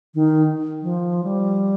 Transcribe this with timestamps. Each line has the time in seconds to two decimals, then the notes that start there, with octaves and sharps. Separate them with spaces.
0.15 D#3
0.83 F3
1.24 G3